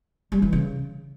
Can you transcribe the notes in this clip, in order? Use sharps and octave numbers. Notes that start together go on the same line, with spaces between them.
G3
E3
C#3